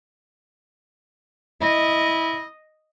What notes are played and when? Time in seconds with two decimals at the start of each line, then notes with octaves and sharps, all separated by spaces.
1.62 E4 D#5